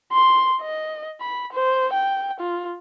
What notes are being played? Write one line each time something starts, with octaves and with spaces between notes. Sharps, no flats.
C6
D#5
B5
C5
G5
F4